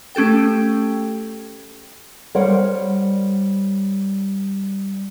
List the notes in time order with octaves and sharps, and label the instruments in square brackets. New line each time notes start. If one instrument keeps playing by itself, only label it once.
[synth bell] A3 C#4 G4 A4 G5
[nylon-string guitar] G3 A#4 C5 C#5 F#5